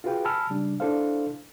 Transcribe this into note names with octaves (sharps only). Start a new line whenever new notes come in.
F4 F#4 G#4 B4 F5 G5
G#5 A5 B5 E6 F6
C#3 G3 D4
D4 E4 A4 C5 F5